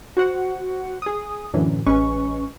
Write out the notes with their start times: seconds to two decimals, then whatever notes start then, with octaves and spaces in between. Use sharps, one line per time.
0.17 F#4 C5 F#5
1.02 G#4 D#6
1.54 F#2 A2 D3 E3 F#3
1.86 A1 G#3 C#4 B4 C#6